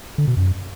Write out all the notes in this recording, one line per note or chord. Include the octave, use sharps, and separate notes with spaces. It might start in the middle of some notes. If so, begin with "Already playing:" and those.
D3
B2
F#2